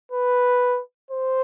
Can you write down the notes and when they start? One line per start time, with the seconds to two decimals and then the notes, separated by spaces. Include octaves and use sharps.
0.12 B4
1.11 C5